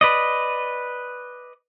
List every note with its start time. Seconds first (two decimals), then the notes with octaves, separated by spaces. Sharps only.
0.01 B4 D5 D#5